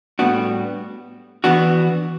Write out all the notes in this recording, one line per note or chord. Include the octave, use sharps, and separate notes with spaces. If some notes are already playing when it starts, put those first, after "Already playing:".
A2 G3 B3 D4 F#4
E3 B3 D4 F#4